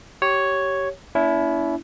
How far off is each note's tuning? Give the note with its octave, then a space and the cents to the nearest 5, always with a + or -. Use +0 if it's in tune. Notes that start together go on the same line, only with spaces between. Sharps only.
G4 -20 C#5 +0
A#3 +15 C#4 +45 E4 +0